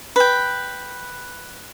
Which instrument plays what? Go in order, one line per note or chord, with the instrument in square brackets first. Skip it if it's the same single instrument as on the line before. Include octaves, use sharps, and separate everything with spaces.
[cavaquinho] B4 G5